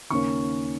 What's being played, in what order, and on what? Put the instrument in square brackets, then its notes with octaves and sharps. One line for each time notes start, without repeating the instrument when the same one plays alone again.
[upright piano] D#2 C#3 A#3 C#4 C#6